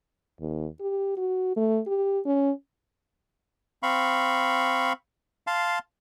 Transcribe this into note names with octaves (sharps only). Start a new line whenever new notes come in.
D#2
G4
F#4
A3
G4
C#4
C4 F5 B5 C#6
F5 A5 C6